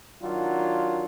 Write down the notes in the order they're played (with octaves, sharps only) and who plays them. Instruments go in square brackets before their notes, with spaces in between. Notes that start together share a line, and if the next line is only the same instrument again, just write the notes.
[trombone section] D#3 F#3 D4 F4